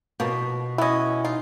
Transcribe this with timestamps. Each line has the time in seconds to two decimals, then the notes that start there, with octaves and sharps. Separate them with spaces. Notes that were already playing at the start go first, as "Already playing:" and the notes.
0.20 B2 F3 A#3
0.78 B3 C#4 E4 D#5
1.25 D#4 F4